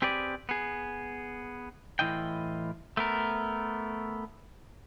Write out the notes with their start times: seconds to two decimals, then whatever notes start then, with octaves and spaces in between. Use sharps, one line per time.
0.02 C4 G4 G#4 B4 D5
0.49 B3 G#4
1.99 A2 E3 E4 F4 D#5 G5
2.97 A3 B3 A#4